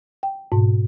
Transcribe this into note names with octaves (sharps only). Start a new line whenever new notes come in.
G5
G#2 B2